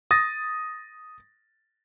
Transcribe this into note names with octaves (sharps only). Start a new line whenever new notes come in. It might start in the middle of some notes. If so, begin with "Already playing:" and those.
D#6 A6 A#6